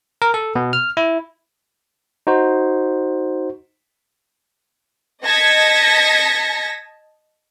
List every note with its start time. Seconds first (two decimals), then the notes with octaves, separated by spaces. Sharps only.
0.22 A#4
0.34 A4
0.55 B2
0.73 F6
0.97 E4
2.27 D#4 F#4 C5
5.25 D#5 A5 G#6 A#6 B6 C#7